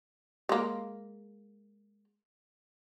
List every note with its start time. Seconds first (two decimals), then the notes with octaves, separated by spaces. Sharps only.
0.49 G#3 A#3